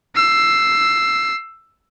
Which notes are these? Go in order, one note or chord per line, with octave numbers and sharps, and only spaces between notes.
E6 C7